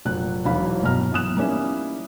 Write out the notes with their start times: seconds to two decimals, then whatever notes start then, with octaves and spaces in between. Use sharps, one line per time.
0.05 F1 A#2 F#3 F#6
0.45 E1 B1 E3 D#4 F5 B5
0.82 B1 G2 B2 B3 A#5 F6
1.12 B1 E3 B3 D#6 F#6 E7
1.37 G3 A#3 B3 C#4 D#4 E4